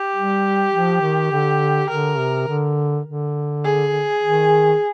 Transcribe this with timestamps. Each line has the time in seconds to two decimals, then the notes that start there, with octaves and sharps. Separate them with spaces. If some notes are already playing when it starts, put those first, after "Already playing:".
Already playing: G4
0.15 G3
0.73 F3
1.02 D#3
1.32 D3
1.89 D3 A#4
2.18 C3
2.48 D3
3.06 D3
3.64 G#4
4.23 D#3